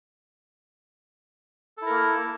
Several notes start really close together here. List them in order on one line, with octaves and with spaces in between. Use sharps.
A4 E4 A#4 A#3